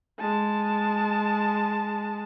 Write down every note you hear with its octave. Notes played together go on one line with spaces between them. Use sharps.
G#3 A5